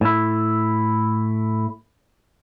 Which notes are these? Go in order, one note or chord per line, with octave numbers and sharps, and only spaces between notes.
A2 E4